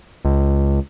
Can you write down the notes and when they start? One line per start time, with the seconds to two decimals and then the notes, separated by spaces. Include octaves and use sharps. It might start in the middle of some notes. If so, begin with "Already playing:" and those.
0.25 C#2